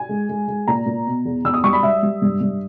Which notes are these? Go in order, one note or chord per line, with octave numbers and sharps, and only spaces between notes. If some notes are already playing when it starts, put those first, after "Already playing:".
Already playing: G#5
G#3
G#3
G#3
A#2 A#5
A#2
B2
E2
E2 E6
D#6
G3 C#6
B5
G3 E5
G3
G2
G2